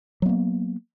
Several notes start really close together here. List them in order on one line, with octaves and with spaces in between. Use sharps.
F#3 B3 A#3